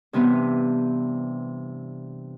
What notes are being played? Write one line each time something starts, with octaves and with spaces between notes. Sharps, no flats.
G2 C3 E3 B3 C4